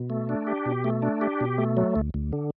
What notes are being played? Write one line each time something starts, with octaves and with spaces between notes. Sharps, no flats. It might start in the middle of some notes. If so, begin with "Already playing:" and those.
Already playing: B2
A3
D4
G4
B2
A3
D4
G4
B2
A3
F#3
D2
D2
D3